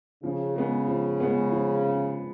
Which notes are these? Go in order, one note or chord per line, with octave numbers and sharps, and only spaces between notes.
C#3 F3
G#3 B3
F3
G#3 B3
F3